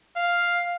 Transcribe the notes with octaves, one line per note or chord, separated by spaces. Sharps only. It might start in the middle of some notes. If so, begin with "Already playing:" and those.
F5